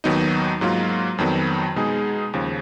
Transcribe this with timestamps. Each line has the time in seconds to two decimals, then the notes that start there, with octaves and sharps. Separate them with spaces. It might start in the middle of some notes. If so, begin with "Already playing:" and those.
0.04 D#2 D#3 F#3 B3 D#4
0.61 G#2 F#3 A#3 F4
1.18 F2 D#3 F#3 B3
1.76 B2 G#3 D#4 G#4
2.33 D#2 C#3 F3